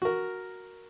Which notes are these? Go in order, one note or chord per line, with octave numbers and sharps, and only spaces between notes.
F#4 A#4